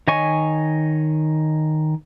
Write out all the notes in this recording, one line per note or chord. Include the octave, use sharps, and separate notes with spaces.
D#3 C#5 D#5 G#5 C#6